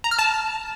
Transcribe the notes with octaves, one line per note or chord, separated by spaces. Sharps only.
A#5
F6
A5